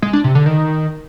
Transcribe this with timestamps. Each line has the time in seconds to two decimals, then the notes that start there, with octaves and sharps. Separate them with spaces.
0.02 G#3
0.13 D4
0.24 C3
0.35 D3
0.46 D#3